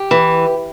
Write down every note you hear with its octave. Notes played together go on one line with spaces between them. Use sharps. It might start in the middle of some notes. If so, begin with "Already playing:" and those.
Already playing: G4
E3